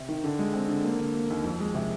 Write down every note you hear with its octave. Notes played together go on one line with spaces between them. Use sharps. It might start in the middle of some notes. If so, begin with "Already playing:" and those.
Already playing: C3
D#3
D3
G#3
C4
D3
A#3
D3
A#3
D#2
F2
G#3
C3